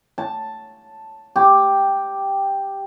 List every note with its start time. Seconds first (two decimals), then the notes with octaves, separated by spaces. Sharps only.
0.18 A5
1.36 G4